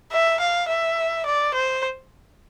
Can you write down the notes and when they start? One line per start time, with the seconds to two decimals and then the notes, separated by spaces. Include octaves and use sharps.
0.12 E5
0.40 F5
0.69 E5
1.25 D5
1.54 C5